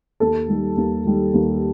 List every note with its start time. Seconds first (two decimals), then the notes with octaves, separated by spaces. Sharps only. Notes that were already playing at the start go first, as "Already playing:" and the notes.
0.20 D#2 A4
0.48 D#3 G3
0.77 D#2
1.05 D#3 G3
1.34 D#2